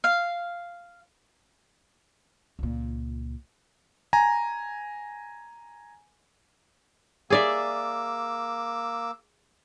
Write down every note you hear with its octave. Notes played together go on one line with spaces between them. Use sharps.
F5
C#2 A#2
G#5 A#5
A#3 G#4 D5 E5 D6 E6